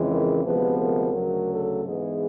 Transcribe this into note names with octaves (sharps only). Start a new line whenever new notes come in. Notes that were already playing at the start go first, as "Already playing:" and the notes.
Already playing: F2 C#3 E3 G#3
A#4
D2 C3 F3 G#3 B3 B4
A#4
D2 C#3 F#3
A4
G#2 E3 G#3 B3 G#4